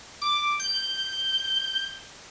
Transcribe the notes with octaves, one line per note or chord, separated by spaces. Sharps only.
D6
G6